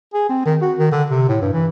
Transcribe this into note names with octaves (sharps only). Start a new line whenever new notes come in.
G#4
C4
D#3
F#4
D#3
D3
C3
A2
G2
E3